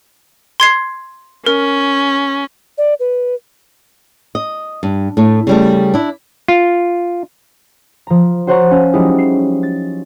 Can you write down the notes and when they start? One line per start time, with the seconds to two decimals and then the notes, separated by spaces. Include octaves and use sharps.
0.60 C6 G#6 C7
1.46 C#4 A#4
2.78 D5
3.00 B4
4.35 D#5
4.83 G2
5.17 A2 A3
5.47 C#3 G3 A3
5.94 D4 E4
6.48 F4
8.07 F3 A#5
8.47 F#4 C5 C#5 F#5 A#5 C#6
8.71 C#4 F5 A5
8.93 F3 F#3 G#3 D#4 E4 G4
9.18 C7
9.63 A6